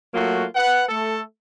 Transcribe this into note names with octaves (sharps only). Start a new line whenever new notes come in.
F#3 A3 A#3 F4 F#4
B4 F#5
A3 A4